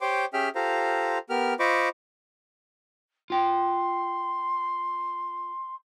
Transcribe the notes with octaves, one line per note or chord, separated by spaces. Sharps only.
G4 C5 C#5 G5 C6 D6
C#4 G4 G#4 E5 G5 F6
F4 G4 A4 C5 F5 A#5
B3 G4 A#4 F6
F4 C5 D#5 B5 C#6 D6
F4 G5 C6